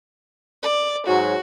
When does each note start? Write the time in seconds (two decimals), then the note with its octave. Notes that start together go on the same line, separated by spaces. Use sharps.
0.63 D5
1.07 G#2 F#3 F#4